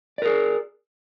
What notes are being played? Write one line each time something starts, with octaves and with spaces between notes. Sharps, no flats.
G#4 A#4 D5